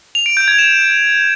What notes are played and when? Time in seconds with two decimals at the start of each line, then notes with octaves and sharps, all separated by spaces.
0.15 F7
0.26 D7
0.37 G6
0.48 G#6
0.59 E7